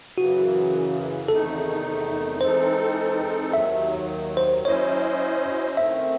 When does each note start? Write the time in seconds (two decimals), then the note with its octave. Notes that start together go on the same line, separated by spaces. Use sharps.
0.17 F#2 C#3 E3 F#4
1.28 E2 C3 D#3 A3 D#4 A4
2.41 E3 G#3 C4 D#4 A4 C5
3.53 D#2 D#3 F#3 E5
4.37 C5
4.65 F#3 C#4 E4 C5 C#5 D#5
5.77 D#3 A3 C4 E5